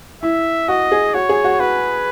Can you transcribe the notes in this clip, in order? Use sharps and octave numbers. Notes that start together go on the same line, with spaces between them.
E4 E5
F#4 D#5
G#4
F#4 C#5
G#4
F#4
F#4 B4